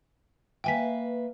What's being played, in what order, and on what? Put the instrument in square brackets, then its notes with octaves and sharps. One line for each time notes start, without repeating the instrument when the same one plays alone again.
[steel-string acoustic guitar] A#3 B4 E5 [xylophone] G5 G#5 B6